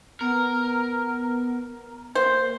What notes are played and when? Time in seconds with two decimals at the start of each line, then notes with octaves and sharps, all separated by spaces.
0.21 B3 A#4
2.15 A#3 C5